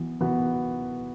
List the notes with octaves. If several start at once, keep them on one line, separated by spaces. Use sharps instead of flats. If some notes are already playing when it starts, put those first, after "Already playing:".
Already playing: E3 B3 F#4
E3 B3 F#4